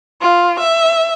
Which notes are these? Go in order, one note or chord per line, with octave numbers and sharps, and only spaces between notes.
F4
E5